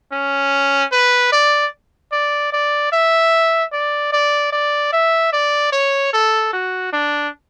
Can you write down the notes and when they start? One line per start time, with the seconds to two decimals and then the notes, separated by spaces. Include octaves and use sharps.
0.12 C#4
0.92 B4
1.32 D5
2.12 D5
2.52 D5
2.92 E5
3.72 D5
4.12 D5
4.52 D5
4.93 E5
5.32 D5
5.72 C#5
6.13 A4
6.53 F#4
6.93 D4